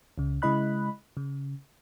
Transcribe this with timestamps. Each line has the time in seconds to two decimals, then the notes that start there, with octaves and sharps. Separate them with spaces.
0.18 C#2 C#3
0.42 C#3 G#3 E4 D#5 B5 F#6
1.17 C#3